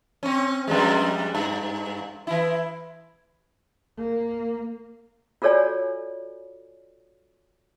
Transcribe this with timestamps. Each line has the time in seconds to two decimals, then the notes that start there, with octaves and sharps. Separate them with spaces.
0.23 C4 C#4
0.68 F2 G3 G#3
1.35 G2
2.27 E3 E4
3.97 A#3
5.42 F4 F#4 A4 C#5 D5 G#5